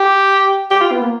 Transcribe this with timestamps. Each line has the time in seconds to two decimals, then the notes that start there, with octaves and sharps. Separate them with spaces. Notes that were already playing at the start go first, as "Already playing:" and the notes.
Already playing: G4
0.71 G4
0.81 F4
0.92 B3
1.02 A#3